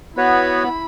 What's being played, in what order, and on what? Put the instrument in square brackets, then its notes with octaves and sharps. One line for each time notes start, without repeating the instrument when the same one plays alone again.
[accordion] B3 [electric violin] E4 B5 [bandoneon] F#4 B4 C#5